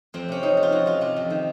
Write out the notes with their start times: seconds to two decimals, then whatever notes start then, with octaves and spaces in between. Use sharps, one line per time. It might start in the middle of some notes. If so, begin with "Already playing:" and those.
0.14 F2 C4
0.29 C3 C#4
0.43 F2 D#4
0.57 F2
0.63 F4
0.72 F2 F#4
0.86 F2 F4
1.01 C3 F4
1.17 F2
1.30 D#3